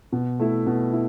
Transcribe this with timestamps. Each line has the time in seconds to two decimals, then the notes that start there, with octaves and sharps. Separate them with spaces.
0.12 B2
0.39 A3 E4
0.66 B2
0.93 E4